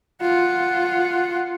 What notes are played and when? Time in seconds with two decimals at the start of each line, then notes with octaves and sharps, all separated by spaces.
0.22 F4 F#5